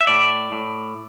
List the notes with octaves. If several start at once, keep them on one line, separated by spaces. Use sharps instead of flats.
E5
A2 D5
A2